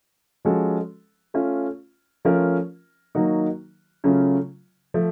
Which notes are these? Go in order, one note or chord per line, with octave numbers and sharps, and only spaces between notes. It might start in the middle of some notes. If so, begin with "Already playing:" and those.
F3 G#3 C#4 F#4 A4
A3 C#4 F4
F3 A3 C#4 F4 A#4
D#3 F#3 A#3 D#4 F#4
C#3 F#3 A3 C#4 F4
F3 A3